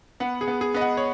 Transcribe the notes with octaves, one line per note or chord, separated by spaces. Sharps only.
B3 F#5
G#4
B3
G#4
B3 D#5
F#5
C#5